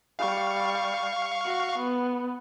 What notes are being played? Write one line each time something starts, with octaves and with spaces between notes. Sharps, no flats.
G3 F5 C#6
F#4
B3